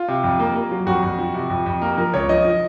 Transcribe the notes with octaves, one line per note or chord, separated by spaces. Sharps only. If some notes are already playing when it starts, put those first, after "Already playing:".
Already playing: F4
C3
F2
A#3
A#3
F#3
F2 F#4
F2
F3
C3
F2
F2
A#3 A#4
F3 A#4
C#2 C#5
F3 D#5
F3